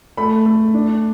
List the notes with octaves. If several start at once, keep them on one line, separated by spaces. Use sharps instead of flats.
A3 B5
A3
D4